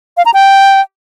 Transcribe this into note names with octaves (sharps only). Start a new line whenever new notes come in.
F5
A#5
G5